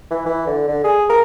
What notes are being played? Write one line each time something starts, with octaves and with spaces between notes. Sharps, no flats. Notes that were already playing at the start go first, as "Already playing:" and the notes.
E3
E3
D3
D3
G#4
A#4